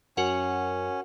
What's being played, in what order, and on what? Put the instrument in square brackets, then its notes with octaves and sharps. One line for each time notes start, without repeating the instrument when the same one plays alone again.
[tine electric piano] F#2 [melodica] C#4 [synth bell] F#4 A#4 F#5